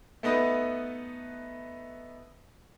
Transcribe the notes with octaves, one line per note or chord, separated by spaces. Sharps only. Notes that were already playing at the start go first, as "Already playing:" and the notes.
A3 B3 D#4 B4